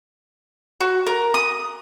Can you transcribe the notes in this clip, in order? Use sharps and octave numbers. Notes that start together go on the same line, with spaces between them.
F#4
A#4
D#6